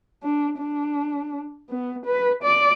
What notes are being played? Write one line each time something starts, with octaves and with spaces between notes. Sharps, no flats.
D4
D4
B3
B4
D5